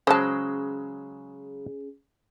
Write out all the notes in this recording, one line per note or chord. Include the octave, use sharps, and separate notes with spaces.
C#3 F#3 G#3 C#4 G#4 C5 A5